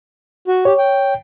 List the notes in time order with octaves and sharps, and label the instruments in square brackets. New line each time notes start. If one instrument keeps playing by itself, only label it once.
[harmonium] F#4
[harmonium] G4 [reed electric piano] C#5
[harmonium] G5